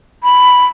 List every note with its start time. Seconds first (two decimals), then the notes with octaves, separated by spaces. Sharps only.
0.24 B5